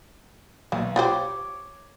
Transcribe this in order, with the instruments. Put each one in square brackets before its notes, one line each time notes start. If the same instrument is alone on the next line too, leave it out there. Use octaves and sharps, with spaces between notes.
[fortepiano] B1 [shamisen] A#3
[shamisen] F4 G4 C5 [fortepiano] C#5 D6